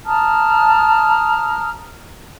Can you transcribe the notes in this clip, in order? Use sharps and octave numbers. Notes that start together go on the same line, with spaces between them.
A5 A#5 D#6 F6